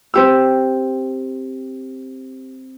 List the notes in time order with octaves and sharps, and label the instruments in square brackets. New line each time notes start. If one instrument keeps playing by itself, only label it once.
[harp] C4 G4 E6